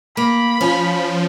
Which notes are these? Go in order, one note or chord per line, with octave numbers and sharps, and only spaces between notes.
A#3 B5
F3 C#4